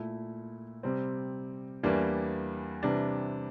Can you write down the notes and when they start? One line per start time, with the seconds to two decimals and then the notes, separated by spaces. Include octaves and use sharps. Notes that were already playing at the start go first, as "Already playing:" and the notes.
Already playing: A#2 A3 E4
0.83 C3 G3 C4
1.83 E2 E3 G3 A#3 D4
2.83 C3 E3 G3 D4